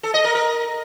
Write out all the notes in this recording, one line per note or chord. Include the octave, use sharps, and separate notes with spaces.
A4
D#5
A#4
A#4